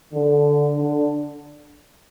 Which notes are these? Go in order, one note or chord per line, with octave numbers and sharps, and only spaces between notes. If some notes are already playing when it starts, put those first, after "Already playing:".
D3
D3